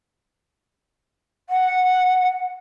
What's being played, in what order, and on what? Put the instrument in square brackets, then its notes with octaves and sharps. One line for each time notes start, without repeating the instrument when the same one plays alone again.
[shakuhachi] F#5